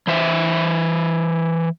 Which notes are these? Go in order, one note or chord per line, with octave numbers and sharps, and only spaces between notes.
E3 C5 E5